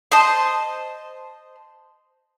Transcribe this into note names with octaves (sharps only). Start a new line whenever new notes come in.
C5 D#5 A5